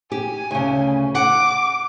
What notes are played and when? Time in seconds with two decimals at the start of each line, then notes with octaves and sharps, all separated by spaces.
0.12 G4 G#5
0.51 D2 C#3
1.15 F#5 D6